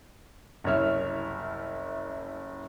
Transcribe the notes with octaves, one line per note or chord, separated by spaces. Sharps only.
F#1 C2 C#5 E5 F6